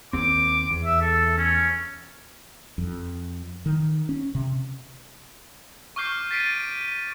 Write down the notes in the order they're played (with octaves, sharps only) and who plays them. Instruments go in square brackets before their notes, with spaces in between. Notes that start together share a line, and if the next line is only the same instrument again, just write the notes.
[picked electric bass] D#2 C4 [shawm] D6
[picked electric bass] E2
[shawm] E5
A4
C#4
[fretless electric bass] F2
D#3
C#4
C3
[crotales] C#6 D6 F6 G6 C7
A6 B6 C7 D7 D#7